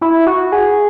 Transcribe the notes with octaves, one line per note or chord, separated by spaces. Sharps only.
E4
F#4
G#4